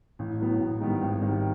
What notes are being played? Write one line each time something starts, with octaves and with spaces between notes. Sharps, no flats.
A1
A2 F#3 B3
A1
G#2 D#3 G3 B3
G#1
G#2 D#3 G3